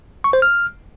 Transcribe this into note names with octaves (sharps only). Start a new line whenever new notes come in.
C#6
C5
F6